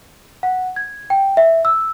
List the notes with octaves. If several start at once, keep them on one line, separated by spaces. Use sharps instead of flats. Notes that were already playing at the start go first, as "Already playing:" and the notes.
F#5
G#6
G5
E5
E6